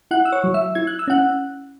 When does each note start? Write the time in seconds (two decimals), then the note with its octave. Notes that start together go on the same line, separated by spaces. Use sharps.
0.11 E4 F#5 F#6
0.25 E6
0.32 C#5 C#6
0.44 F#3
0.54 E5 E6
0.75 E4 G#6
0.87 F#6
0.99 E6
1.08 C#4 F#5 F#6